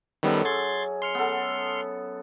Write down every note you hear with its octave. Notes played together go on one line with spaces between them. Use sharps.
F#2 D#3 G3 B3 A4
G#4 C6 G#6 A6
C6 F6 C#7
B3 A4